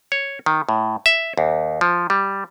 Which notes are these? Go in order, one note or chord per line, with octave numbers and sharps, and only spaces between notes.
C#5
D#3
A2
E5
D#2
F3
G3